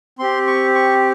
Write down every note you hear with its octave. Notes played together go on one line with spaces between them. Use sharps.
C4 G4 C6
C#6
C#6